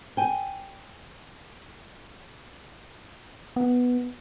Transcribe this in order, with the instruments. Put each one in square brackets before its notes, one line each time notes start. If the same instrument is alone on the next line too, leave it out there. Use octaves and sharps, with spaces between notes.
[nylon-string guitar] G5 G#5
[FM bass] B3